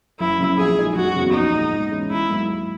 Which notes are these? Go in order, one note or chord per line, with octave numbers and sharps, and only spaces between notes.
F#1 E4
F#2 C#3
A#1 G#4
A#2 G#3 D#4
F#1 F#4
E2 C#3
A#1 D#4
A#2 G#3
G#2
E3 G#3 C#4 E4
G#1 E4
G#2 F#3 A#3
D#2